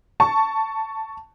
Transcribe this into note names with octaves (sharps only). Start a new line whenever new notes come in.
A5 C#6